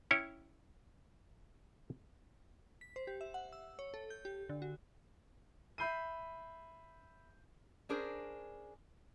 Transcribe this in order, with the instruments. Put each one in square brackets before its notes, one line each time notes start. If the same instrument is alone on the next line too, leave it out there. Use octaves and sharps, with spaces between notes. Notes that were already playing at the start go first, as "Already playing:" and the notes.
[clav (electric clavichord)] C#4 E4 C#5 G5
[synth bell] B6
C5
G4
E5
F#5
E6
C#5
A4
G6
G4
D3
F#4
[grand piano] E5 B5 G6 C7 D#7
[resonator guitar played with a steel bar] C#4 D4 G#4 A#4 C5